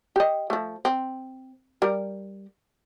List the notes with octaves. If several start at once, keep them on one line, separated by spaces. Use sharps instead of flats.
G4 D#5
F3 A3
C4
G3 A#4